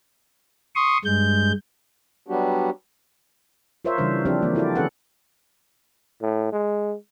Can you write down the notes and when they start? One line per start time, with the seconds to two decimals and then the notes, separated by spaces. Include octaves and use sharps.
0.75 C6 C#6 D#6
1.05 G2 G#3 G6
2.28 F#3 G3 B3 D4 F#4 G4
3.85 F4 A#4 C5 C#5 E5
3.98 C#3 E3 G3 D4 C5
4.25 F3 C4 D4 G4 C5
4.42 E3 A#3
4.55 D4 E4 F#4 A4 D5
4.75 D3 C#4 G#4 A4 B4 F#5
6.22 A2
6.52 G#3